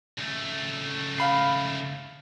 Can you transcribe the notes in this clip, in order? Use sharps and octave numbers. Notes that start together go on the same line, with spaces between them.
C#2 A3
F5 B5 C7